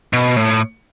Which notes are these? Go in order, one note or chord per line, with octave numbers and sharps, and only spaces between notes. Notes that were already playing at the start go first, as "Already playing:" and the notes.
B2
A2